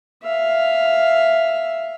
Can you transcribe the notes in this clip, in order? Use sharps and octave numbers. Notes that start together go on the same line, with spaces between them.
E5 F5